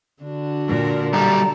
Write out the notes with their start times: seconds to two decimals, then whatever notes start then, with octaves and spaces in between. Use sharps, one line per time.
0.23 D3 D4 F#4
0.68 A#2 A#4
1.13 B1 G3 A4 A#5